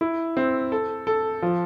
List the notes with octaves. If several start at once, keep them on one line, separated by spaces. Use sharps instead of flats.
E4
C4
A4
A4
F3